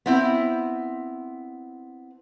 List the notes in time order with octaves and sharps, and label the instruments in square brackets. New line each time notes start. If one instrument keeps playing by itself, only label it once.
[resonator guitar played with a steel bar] B3 C4 E4